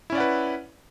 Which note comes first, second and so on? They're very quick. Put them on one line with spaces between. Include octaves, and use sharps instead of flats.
E4 C#4 D5 F#5 B4